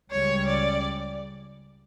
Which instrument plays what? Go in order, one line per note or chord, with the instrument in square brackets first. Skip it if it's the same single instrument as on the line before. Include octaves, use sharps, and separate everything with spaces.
[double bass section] C#2 C#3 G3 [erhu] C#5
[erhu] D5